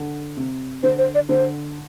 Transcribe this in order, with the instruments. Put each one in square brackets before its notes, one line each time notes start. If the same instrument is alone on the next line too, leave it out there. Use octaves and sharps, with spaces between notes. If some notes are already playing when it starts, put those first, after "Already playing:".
Already playing: [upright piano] D3
C3
[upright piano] D3 [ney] C5
[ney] C5
D5
[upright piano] D3 [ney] C5